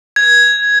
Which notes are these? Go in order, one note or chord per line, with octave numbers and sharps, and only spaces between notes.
G#6